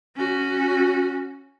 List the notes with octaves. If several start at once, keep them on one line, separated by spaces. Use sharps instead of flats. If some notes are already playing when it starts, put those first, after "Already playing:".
C#4 F#4